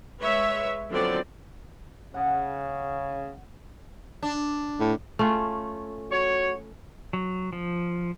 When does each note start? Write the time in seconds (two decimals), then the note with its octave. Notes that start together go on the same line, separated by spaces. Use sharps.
0.21 G#3 B4 C#5 E5
0.91 D3 F3 F#3 B3 C4 D5
2.14 C#3 F#5
4.23 D4
4.80 A2
5.19 A3 C#4 F4
6.11 F#4 C#5
7.13 F#3
7.53 F3